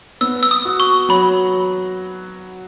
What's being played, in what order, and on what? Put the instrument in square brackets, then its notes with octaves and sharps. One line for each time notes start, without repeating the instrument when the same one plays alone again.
[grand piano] B3 [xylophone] E6
[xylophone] E6
D#6
[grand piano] F#4
[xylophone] C#6
[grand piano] F#3 [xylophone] B5